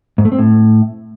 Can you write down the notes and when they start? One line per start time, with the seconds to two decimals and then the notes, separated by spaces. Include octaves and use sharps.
0.18 G#2
0.25 A3
0.32 C4
0.39 A2